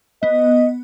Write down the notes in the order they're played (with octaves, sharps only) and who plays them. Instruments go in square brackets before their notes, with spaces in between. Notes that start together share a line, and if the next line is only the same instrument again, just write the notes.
[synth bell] B3 [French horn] D#5